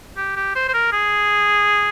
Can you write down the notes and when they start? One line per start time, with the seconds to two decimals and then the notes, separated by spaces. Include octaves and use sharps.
0.17 G4
0.36 G4
0.55 C5
0.68 C5
0.74 A#4
0.92 G#4